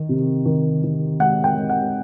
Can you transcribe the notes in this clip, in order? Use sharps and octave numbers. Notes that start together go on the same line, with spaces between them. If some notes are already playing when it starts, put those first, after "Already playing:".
Already playing: D#3
C3
D#3
D#3
G#3 F#5
G5
G#3
F#5